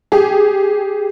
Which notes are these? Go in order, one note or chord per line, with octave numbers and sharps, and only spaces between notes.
G4 G#4